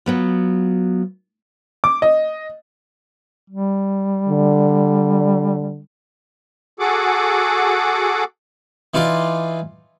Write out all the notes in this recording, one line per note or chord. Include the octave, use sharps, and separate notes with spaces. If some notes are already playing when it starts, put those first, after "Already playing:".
F#3 B3 F4
D6
D#5
G3
D3
F#4 G#4 A4 F#5 D6
E3 D#4 F4 D5 C6